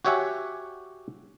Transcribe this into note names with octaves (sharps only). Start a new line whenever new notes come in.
F#4 G4 C#5 E5 F#5 G#5